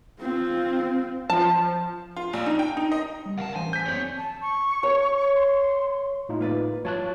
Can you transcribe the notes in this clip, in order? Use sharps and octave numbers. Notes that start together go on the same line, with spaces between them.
C4 F4
F3 A5
F4
A#1
D#4
G5
D#4
D#5
G3
C2 A#4 F5 F#5 A5
A1 E3 C5 G#5
G6 B6
G1 F2 C#5 D5 F#7
A5
C#6
C#5
C6
A2 D#4 F4
A#3 B4 D5
G2 F#3 F4 C#5 A5 F#6